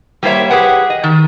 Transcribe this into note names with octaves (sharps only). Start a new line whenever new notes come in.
G3 A#3 F4 C5 C#5 E5
G4 G#4 A#4 B4 F#5 G5
D#5
D#3